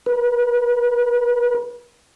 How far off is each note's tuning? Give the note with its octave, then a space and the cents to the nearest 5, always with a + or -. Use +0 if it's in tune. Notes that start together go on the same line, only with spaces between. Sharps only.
B4 -35